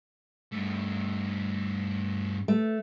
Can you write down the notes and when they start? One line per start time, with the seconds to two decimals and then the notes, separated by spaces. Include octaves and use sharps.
0.52 G2 A3
2.48 A3